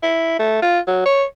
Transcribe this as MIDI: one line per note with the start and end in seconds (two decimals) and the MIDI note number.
0.03 0.34 64
0.39 0.61 57
0.62 0.80 65
0.87 1.01 54
1.06 1.24 73